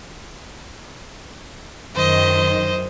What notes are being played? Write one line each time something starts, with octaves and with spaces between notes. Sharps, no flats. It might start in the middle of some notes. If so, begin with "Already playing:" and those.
F#2 D#3 C5 D#5